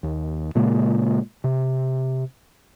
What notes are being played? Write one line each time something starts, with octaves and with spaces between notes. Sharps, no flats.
D#2
A#2 C#3 G#3 A#3
C3